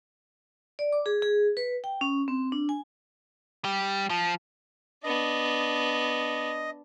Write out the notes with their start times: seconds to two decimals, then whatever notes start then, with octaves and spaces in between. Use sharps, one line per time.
0.79 D5
0.93 D6
1.06 G#4
1.22 G#4
1.57 B4
1.84 G5
2.01 C#4
2.28 C4
2.52 D4
2.69 G#5
3.65 G3
4.10 F3
5.04 B3 D4 D#5